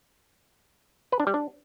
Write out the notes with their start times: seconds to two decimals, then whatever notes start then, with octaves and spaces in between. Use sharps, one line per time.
1.12 B4
1.20 D4
1.27 G3
1.34 D4